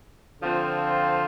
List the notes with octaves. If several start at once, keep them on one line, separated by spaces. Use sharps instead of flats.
D3 F3 C4 F4